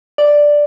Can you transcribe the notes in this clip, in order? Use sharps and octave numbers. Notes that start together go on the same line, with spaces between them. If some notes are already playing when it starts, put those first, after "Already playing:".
D5